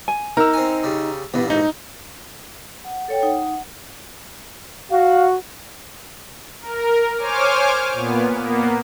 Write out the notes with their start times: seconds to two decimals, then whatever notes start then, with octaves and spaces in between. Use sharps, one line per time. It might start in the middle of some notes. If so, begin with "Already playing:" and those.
0.08 G#5
0.37 D#4 A#4 A#5 E6
0.53 C4 G#5
0.83 C#3 G3
1.34 E2 G2 A#2 B3
1.50 G#2 D#4
2.85 F#5
3.08 A4 C#5 G5
3.23 D#4 F#5
4.91 F#4 F5
6.62 A#4
7.16 C5 C#5 G#5 D6 F6
7.93 A#2 B3
8.34 A#3 B3